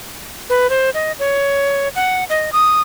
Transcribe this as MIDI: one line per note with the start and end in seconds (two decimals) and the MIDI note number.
0.50 0.70 71
0.70 0.90 72
0.94 1.12 75
1.19 1.88 73
1.96 2.24 78
2.30 2.50 75
2.53 2.82 87